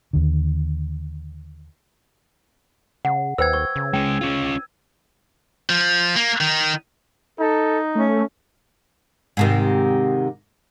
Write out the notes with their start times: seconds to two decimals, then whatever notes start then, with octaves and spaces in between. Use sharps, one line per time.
0.13 D#2 D3
3.05 C#3 F#5
3.38 D#2 B4 C5 G5 E6 G#6
3.53 C#6
3.76 C#3
3.94 G#3 C#4 G5
4.21 C#4 F4
5.70 F3
6.16 A#3
6.41 D#3
7.40 D#4 A4
7.95 A3 C#4
9.37 G#2 C3 D#3